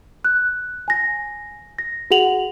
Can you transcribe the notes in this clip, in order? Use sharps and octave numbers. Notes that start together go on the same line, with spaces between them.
F#6
G#5 A#6
A#6
F#4 G#4 F#5 F7 F#7